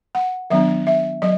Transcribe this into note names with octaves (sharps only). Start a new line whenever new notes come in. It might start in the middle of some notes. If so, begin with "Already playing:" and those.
F#5
D#3 F#3 B3 D4 E5
E5
F#3 D#5